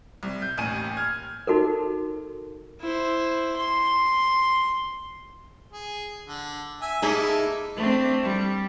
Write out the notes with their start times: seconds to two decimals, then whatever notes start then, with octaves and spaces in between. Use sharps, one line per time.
0.23 C2
0.42 G6
0.58 A1 D#2 G#5 D#7
0.97 F6 G#6
1.47 D#4 F#4 A4 A#4
2.81 E4 C5
3.56 C6
5.73 G#4
6.27 D3
6.82 E5 G#5
7.02 A#3 D#4 E4 G#4 A4 E5
7.76 A3 C4 D4
8.23 G3